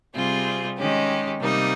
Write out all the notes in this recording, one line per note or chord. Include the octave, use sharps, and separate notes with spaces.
C3 G3 C4 F4 G#4
D#3 G#3 C#4 G4
C3 G3 A#3 D#4